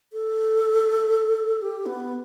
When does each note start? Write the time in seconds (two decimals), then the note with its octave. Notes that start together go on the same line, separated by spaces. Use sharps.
0.13 A4
1.62 G4
1.86 B3